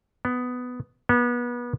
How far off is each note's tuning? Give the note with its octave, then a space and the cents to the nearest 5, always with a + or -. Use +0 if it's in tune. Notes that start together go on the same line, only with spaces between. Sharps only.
B3 +10
B3 -30